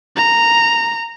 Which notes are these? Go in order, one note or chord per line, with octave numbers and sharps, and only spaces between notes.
A#5